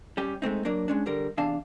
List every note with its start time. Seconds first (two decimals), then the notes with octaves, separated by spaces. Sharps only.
0.17 G3 C#4 G4
0.42 G#3 A3 C4 D#4
0.65 F#3 A#3 D4 A#4
0.88 G#3 C#4 D4
1.06 D3 G3 A#4
1.37 E2 C3 D4 F5 A5